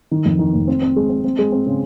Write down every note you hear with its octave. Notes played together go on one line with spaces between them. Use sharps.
D#3
F2
D#3
F1
C4
C4
G#3
C4
C4
G#3
C4
C#3